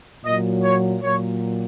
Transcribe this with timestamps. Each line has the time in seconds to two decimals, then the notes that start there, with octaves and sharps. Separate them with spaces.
0.24 A#2 F#3 D#5
0.63 C#5
1.02 A#2 F#3 C#5